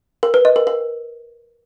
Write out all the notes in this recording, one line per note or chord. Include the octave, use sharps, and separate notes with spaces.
A#4
B4
D#5
A#4
A#4